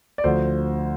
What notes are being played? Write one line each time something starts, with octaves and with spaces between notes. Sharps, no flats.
D5
D2 D3 F3 C5